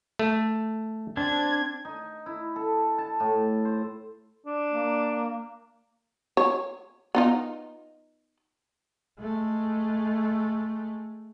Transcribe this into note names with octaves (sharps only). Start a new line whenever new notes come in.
A3
C4 D4 G#6
D#4
E4
A4
A5
A2
C5
D4
A#3
C#5
B3 D#4 F4
G#3 A3